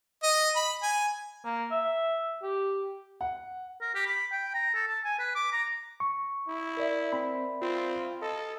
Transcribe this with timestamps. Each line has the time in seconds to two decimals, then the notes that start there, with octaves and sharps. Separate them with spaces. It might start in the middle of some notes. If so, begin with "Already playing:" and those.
0.23 D#5
0.56 B5
0.83 G#5
1.45 A#3
1.71 E5
2.43 G4
3.21 F#5
3.81 A#4
3.95 G4
4.06 B5
4.32 G5
4.54 A#5
4.75 A4
4.88 A5
5.04 G#5
5.19 B4
5.35 D6
5.52 A#5
6.00 C#6
6.47 E4
6.77 A#4 D5 E5
7.13 C4 B5
7.62 C4 F4
8.22 A4 D#5